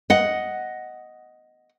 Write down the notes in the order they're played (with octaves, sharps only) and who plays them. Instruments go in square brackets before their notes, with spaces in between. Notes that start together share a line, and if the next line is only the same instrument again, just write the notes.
[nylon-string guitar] D#5 F#5